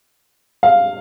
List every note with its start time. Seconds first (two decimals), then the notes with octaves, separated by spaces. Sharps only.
0.63 F5